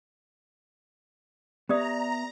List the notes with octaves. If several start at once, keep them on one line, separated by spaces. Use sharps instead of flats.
B3 G4 B4 D5 E5 A#5 D#6